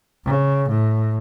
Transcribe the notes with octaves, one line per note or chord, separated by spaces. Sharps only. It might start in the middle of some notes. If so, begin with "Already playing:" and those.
C#3
A2